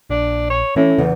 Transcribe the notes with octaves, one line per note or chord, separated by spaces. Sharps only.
A#1 D4
C#5
A2 E3 C#4
E2 C#3 E3